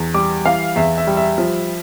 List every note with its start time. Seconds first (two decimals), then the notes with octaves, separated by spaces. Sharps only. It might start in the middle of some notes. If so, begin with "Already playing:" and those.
Already playing: E2
0.14 G3 D6
0.45 E3 F5
0.76 E2 E5
0.98 E5
1.07 G3
1.17 E5
1.38 F3